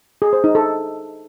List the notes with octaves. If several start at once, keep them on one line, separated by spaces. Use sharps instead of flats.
G#4
C5
D#4
A4